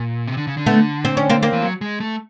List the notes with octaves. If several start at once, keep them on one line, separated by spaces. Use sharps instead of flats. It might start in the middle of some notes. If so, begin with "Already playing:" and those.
Already playing: A#2
C3
D3
C#3
D3
A3 B3
C4
C#4
A#3 C4
A#3 C4
E3
F#3
G#3
A3